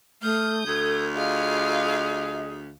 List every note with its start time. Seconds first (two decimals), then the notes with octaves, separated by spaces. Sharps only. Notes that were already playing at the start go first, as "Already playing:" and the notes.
0.22 A3 D#6 F6 G6
0.67 D2 A4 G#6
1.15 F4 G#4 D#5 F5